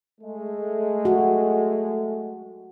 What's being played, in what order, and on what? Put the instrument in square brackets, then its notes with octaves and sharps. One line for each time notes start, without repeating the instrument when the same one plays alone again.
[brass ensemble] G#3 A3
[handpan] F#4